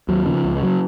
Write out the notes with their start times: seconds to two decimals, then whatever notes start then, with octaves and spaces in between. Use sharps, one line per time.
0.08 D#2 F#3
0.26 C#3 F3
0.44 C#2
0.62 C#3 F#3